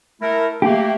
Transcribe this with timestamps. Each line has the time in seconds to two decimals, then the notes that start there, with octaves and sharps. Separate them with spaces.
0.21 A3 E4 A#4
0.62 A3 A#3 G4